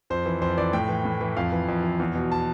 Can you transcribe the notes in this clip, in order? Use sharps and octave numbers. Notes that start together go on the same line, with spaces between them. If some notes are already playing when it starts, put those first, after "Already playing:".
F2 C5
E3
F2 C5
E3 D5
A2 G5
E3
A2
E3
F2 F5
E3
F2
E3
E2
B2
A5